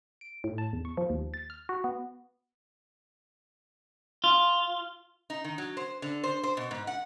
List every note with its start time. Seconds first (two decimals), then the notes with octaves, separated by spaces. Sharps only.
0.21 D7
0.44 A2
0.58 A5
0.73 E2
0.85 C#6
0.97 F3
1.10 D#2
1.34 A6
1.50 F6
1.69 F#4
1.84 B3
4.24 F4
5.30 D#4
5.44 D#3
5.58 F#3
5.77 C5
6.02 D3
6.24 C5
6.43 C5
6.57 B2
6.71 G#2
6.87 F#5